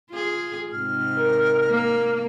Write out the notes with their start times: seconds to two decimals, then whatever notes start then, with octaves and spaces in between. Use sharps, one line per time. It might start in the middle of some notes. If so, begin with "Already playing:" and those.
0.10 F4 G#4
0.72 G#2 C3 F6
1.18 A#4
1.70 A#3